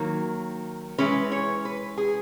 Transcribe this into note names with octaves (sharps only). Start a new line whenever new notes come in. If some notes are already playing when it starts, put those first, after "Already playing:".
Already playing: D#3 F#3 A#3
E3 G#3 C#4 B4
C#5
B4
G#4